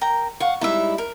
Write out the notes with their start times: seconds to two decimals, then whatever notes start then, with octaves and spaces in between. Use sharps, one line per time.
0.01 A#4 G5 A#5
0.40 F5 F#5 C#6
0.61 G3 G#3 D#4 E4 E5
0.98 A#4